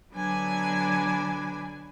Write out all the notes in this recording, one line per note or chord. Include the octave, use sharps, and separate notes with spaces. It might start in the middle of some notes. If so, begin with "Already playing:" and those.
B2 D3 F#3 D4 B4 G#5